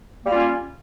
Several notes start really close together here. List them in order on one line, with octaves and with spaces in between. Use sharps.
A#3 G3 F4 C#4